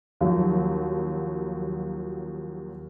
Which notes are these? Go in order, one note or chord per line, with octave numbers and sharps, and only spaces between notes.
D#2 F3 F#3